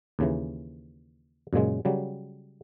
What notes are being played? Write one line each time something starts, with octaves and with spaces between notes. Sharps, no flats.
D#2 C#3 E3
F#2 A#2 C#3 G#3
C#3 F#3 G3